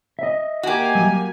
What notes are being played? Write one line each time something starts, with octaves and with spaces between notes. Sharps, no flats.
D#5 E5
A#3 F#4 G4 G#5
F#3 G3